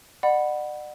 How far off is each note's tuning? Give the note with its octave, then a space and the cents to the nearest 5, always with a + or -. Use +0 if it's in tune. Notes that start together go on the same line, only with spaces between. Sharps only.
D5 +40 F#5 +0 B5 +0